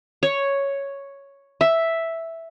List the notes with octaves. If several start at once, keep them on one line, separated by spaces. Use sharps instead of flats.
C#5
E5